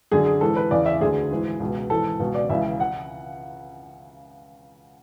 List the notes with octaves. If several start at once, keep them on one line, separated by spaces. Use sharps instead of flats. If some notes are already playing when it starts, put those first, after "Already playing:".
F#2 D3 G#4
G#4
G#2 E3 A4
B4
E2 C#3 E3 D5
E5
D2 D3 G#4
G#2 E3
C#2 B2
G#2 E3 A4
C#2 B2
D5
C#2 C#3 E3 E5
F#5